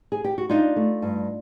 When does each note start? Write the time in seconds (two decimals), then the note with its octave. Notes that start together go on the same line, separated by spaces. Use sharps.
0.12 G#4
0.24 G4
0.38 F#4
0.50 D4 D#4 F4
0.76 A3
1.02 G2